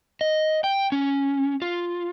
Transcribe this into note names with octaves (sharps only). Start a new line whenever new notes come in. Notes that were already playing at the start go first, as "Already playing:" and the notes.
D#5
G5
C#4
F4